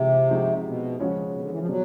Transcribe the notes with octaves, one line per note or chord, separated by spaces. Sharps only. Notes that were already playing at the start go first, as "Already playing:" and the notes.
Already playing: C3 E3 G#3 C4 F4
F3 G#3 C4 D#4 F#4
B2
C#3 F3 G#3 C#4 F#4
B2
D3
E3
F3
B2 F#3 G3